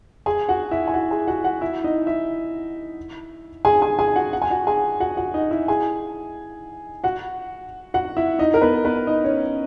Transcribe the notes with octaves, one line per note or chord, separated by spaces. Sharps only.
G#4 G#5
F#4 F#5
E4 E5
G#5
F#4 F#5
G#4 G#5
F#4 F#5
F#4 F#5
E4 E5
D#4 D#5
E4 E5
G#4 G#5
G#4 G#5
G#4 G#5
F#4 F#5
F#5
G#5
F#4 F#5
G#4 G#5
F#4 F#5
F#4 F#5
D#4 D#5
E4 E5
G#4 G#5
F#4 F#5
F#4 F#5
E4 E5
D#4 D#5
A#4
B3 B4
B3 B4
D#4 D#5
C#4 C#5